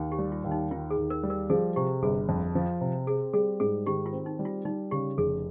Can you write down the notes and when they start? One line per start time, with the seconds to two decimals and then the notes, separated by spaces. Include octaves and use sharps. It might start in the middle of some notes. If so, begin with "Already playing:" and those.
Already playing: D#2
0.12 G4
0.18 G3
0.32 F4
0.44 D#2
0.51 D#4
0.71 D#3 F4
0.90 G#4
0.97 D#2
1.10 A#4
1.23 G3
1.30 A#4
1.50 F3 G#4
1.76 C3 G4
2.02 G1 G#4
2.29 F2
2.55 F3
2.81 C3
3.07 C4 G#4
3.33 G3 G#4
3.60 G#2 G#4
3.86 D#3 G4
4.06 F4
4.12 C4
4.26 D#4
4.39 G3
4.45 F4
4.65 G3 D#4
4.91 C#3 G4
5.18 F1 G#4